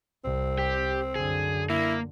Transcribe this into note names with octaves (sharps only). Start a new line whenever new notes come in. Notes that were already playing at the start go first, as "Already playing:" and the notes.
C2 C4
G4
F#2 D3 G#4
A#3 E4